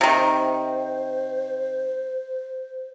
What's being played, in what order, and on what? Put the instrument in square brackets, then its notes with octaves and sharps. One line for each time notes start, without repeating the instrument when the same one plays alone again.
[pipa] C3 D#3 [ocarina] C5